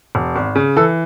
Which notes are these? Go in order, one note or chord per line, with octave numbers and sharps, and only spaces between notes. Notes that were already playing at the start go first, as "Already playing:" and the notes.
E1
G#1
C#3
E3 A4